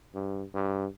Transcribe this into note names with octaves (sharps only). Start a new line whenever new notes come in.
G2
G2